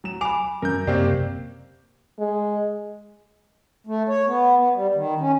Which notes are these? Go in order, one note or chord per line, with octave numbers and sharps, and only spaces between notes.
F#3 E7
G#5 B5 D6 F7
F#2 A#4 G6
F#2 C3 A#3 C4 G4 D5
G#3
A3
C#5
B3
B3
G3
D#3
C#4